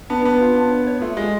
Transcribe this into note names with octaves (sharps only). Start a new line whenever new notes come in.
B3 D4
B3 D4
F4
D4
C#5
C#5
A3 F4
G#3 F4